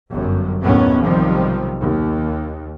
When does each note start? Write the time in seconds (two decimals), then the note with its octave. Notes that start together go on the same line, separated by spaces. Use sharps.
0.10 G1 F#2
0.62 D#2 A2 B3 C#4
1.02 B1 C3 D#3 F3 G3
1.79 D#2